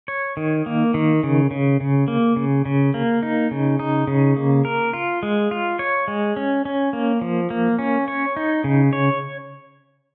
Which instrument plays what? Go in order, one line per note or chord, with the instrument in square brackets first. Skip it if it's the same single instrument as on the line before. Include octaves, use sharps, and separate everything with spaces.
[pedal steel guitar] C#5
D#3
A#3
D#3
C#3
C#3
C#3
A#3
C#3
C#3
A#3
D#4
C#3
D#4
C#3
A#3
A#4
F4
G#3
F4
C#5
G#3
C#4
C#4
A#3
F3
A#3
C#4
C#5
D#4
C#3
C#5